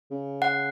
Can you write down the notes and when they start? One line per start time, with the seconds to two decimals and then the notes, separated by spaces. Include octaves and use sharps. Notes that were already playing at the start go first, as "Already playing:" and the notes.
0.11 C#3
0.42 F#5